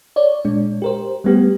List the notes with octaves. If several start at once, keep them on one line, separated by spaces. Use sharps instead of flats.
C#5 D5
A#2 G#3 D4
G4 A#4 C5
G3 A3 B3 G4